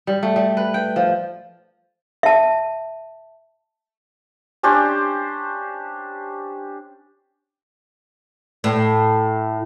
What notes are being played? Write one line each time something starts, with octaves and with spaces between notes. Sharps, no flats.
G3
A3
G3
B4
G5
F3
E5 A5
C#4 D4 G4 C5
A2